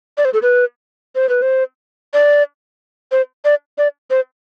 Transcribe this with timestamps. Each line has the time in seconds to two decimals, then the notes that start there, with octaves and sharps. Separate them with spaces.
0.18 D5
0.25 C5
0.34 A4
0.42 B4
1.15 C5
1.29 B4
1.42 C5
2.13 D5
3.12 C5
3.45 D5
3.78 D5
4.10 C5